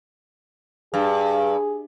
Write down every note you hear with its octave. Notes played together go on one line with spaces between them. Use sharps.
G2 G#4